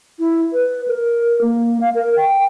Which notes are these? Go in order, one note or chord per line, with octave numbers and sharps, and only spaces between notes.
E4
B4
A#4
A#3
F5
A#4
G5